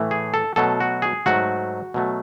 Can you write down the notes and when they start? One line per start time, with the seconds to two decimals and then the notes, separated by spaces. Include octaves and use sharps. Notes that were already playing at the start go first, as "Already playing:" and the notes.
Already playing: A2 E3 A3
0.11 G#4
0.34 A4
0.56 B2 F#3 A3 A4
0.80 F#4
1.02 G#4
1.26 G#2 F#3 A3 F#4
1.94 B2 F#3 A3